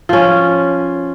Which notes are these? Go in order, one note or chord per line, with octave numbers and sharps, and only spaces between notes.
F3 C#4